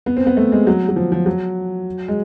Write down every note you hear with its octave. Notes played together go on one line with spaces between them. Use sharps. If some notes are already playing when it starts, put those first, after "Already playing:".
B3
C4
B3
A3
G#3
F#3
F#3
F3
F3
F#3
G#3